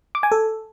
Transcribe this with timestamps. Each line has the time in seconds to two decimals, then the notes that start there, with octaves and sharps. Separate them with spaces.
0.15 D6
0.23 G#5
0.32 A4